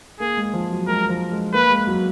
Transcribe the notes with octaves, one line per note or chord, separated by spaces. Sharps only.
A#3 G#4
G#3
F3
F#3
G#3 A#4
F3
G#3
A#3 B4
G#3
F#3